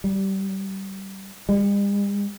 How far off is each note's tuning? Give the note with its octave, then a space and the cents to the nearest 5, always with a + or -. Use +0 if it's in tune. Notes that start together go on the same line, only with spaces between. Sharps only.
G3 -20
G3 +45